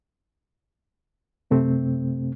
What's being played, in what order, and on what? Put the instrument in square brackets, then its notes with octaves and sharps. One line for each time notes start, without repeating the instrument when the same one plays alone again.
[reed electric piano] F#2 C3 A3 C4